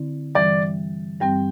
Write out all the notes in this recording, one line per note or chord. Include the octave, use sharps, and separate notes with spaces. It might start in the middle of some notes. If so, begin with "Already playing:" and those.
Already playing: D3 C4 E4
G2 E3 G3 D5
G2 G3 C4 G5